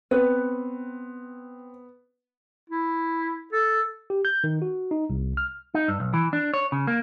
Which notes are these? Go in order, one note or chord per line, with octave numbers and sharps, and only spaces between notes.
B3 C4 B4 C#5
E4
A4
G4
G6
D#3
F#4
D#4
C2
F6
D#4
G2
B1
E3
D4
C#5
C#3
A#3